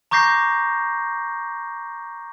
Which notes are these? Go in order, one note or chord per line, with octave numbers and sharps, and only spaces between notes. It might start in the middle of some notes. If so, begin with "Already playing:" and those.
A#5 C#6 D6 G6 A#6 C7